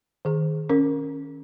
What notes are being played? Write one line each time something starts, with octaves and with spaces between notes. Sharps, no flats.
D#3 G#4
C#4 A#4